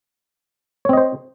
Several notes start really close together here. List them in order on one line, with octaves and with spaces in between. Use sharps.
C#5 C4 D#5 C5